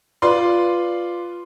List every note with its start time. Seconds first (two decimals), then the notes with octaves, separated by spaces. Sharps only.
0.22 F4 B4 D5 C6